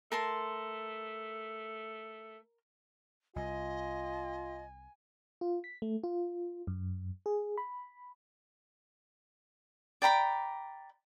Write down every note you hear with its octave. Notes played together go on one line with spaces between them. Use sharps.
A3 A#4 A5 C6
C2 F4 D#5 G#5
F4
B6
A3
F4
F#2
G#4
B5
D5 G5 A#5 B5